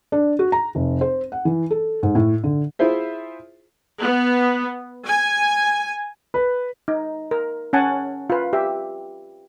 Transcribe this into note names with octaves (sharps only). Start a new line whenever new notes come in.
D4
F#4
A#5
F1
C5
F#5
E3
A4
G#2
A2
D3
E4 F4 G#4 C5 E5
B3
G#5
B4
D#4
A#4
C#4 F#5 G#5 A5
F4 B4
G4 E5